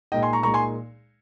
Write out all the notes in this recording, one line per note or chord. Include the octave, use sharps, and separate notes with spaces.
A#2 G#3 D#4 D#5 G5
G#5 C6
A#5 C#6
A#2 G#3 D#4 A#5 C#6
G#5 C6